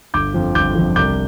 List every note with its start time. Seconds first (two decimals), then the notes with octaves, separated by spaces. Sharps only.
0.14 G1 D6 G6
0.34 F2 F3
0.55 G1 D6 G6
0.75 F2 F3
0.96 C2 D6 G6